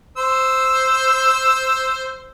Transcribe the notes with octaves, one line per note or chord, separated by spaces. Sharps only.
C5 E6